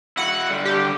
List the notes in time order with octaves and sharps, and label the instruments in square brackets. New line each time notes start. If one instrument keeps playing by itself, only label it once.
[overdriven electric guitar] E4 F#4 [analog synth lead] F#5
[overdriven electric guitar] D3 G3
[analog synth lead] G4